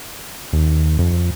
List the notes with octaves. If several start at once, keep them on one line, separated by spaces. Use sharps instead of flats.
D#2
F2